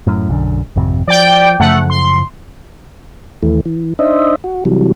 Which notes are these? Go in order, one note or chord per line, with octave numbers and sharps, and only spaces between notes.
F#2 A2
B1 F#2 D3
G#1 F2 C3
F3 D5 G5
F#2 C#3 F3 A3 F#5
C6
D#2 E3 A3
E3
D4 D#4 C5 D#5 E5
F#4
C3 E3 F#3 G3